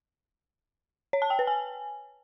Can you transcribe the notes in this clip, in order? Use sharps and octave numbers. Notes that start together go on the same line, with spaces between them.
C#5
A5
G5
B4
G#5